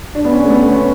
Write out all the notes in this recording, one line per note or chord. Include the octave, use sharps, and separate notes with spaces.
D4
B3
C#4
A3
B3
C#4